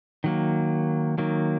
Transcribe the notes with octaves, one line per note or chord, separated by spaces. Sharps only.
D#3 F#3 A#3
D#3 F#3 A#3